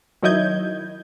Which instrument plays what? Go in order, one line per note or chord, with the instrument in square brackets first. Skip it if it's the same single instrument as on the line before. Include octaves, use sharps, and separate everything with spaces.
[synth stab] D#3 F#3 E4 D#5 G6 G#6